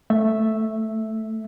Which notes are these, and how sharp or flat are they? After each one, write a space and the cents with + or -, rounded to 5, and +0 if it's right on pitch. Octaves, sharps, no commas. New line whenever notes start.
A3 +0 E5 +0